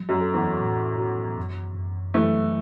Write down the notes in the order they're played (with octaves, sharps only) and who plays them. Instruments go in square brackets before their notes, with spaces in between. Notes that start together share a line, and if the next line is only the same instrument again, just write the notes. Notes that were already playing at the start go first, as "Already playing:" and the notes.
Already playing: [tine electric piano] F#3
[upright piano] F#2
[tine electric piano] A4
[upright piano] E2
[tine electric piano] A2
F#4
F#2
F#2
[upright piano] E3 A3 [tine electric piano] F#3